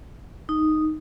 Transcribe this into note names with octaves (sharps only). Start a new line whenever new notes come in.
D#4